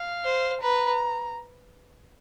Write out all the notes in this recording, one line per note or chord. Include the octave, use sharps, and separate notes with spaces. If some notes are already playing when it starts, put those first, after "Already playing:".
Already playing: F5
C5
B4 A#5